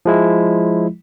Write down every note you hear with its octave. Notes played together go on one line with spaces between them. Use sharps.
F3 G#3 E4